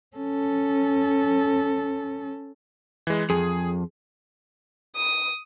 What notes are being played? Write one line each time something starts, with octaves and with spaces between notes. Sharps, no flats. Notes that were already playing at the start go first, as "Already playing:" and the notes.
C#4 A4
E3 G#3
F2 G#4
D#6